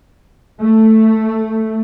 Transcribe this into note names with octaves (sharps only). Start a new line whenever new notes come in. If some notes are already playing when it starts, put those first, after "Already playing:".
A3